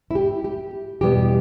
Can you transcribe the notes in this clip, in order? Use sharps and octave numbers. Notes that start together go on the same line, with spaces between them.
E4
G4
G4
E2 B2 G3 B3 G4